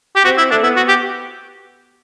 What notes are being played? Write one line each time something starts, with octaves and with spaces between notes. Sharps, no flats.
G4
C4 F#4
E4
A3 D4
B3 E4
F#4
G4